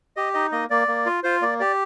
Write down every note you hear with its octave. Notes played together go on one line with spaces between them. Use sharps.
G4 D#5
D#4 D#5
A#3 D#5
A#3 D5
A#3
F4
F4 C5
A#3 D5
G4 D5